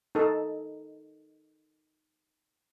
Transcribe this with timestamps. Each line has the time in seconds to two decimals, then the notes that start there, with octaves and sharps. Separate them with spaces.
0.15 D#4 A4